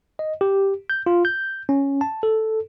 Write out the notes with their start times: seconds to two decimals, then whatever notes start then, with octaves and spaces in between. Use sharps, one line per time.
0.19 D#5
0.41 G4
0.90 G6
1.06 F4
1.25 G6
1.69 C#4
2.01 A5
2.23 A4